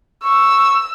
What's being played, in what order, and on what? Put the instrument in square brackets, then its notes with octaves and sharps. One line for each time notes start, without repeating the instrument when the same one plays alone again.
[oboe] C#6 [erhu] E6